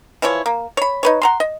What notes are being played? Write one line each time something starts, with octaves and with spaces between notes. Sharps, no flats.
E3 F3 E4 C#5
A#3
C#5 B5
D#4 B4 C#5
F#5 A#5 C6
D#5